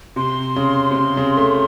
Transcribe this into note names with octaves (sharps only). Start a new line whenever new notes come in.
C3 C6
C#3
C3
C#3
C#3
A3